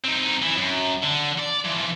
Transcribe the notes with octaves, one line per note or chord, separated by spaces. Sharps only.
C4 D#4
E3
F#2
D3
D5
E3 F3